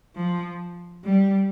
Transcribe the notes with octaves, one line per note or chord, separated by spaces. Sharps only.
F3
G3